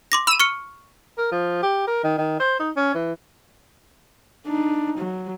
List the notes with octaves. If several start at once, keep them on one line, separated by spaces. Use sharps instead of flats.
C6 D6 A#6
B5 E6 D#7
C#6 F6 C#7
A#4
F3
G4
A#4
D#3
D#3
C5
D#4
C#4
E3
D4 D#4
F#3